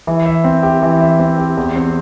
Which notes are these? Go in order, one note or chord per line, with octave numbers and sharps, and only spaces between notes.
E3
E5
C4
G4
E3
E5
C4
G4
E2
C4